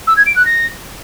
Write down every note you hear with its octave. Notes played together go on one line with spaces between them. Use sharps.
E6
G#6
D7
F#6
A#6